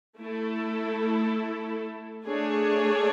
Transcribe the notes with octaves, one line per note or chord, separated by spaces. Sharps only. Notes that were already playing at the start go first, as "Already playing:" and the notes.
A3 E4 A4
A3 D4 G#4 C#5